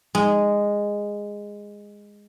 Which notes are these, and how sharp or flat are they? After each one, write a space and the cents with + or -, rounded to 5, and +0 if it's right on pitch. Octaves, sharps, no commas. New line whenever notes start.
G#3 -10